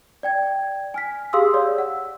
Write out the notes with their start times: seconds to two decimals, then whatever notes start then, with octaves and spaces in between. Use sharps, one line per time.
0.23 D5 G5 G#6
0.94 G#5 F6 B6
1.33 G4 G#4 F5 C6 D#6 E6
1.54 C#5 D5 E6
1.78 F#5